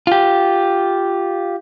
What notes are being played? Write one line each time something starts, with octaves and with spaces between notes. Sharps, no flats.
F4 G4